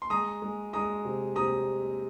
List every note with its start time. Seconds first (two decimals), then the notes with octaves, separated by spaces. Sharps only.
0.02 C6
0.10 G#3 A#5 D#6
0.42 G#3
0.73 G#3 A#5 D#6
1.05 C3
1.36 C3 A#5 D#6